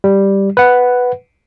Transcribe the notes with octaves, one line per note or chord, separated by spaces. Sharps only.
G3
B4 F#5